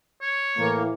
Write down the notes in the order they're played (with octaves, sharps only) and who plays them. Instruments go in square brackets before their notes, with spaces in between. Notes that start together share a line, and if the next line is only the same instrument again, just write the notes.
[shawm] C#5
[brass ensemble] A2 E3 [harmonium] A#3